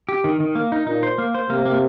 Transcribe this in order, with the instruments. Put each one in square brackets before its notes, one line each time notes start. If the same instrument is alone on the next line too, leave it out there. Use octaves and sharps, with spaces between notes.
[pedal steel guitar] G4
D#3
D#3
A#3
D#4
[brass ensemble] A#2 [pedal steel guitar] D#4
[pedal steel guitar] C5
A#3
C5
[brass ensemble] C3 [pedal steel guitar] A#3
[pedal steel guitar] A#3